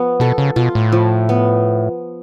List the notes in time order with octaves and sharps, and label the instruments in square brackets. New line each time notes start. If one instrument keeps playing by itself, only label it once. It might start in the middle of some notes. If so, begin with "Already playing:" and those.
Already playing: [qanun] F3 B3
[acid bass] B2 [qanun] A4
[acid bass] C#3
[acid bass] B2 [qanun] F4
[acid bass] A2
[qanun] F3
B3